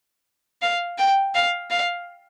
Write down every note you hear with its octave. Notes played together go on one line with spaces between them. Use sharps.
F5
G5
F5
F5